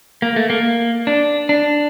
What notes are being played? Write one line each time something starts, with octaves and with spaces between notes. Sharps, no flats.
A#3
A3
A#3
D4
D4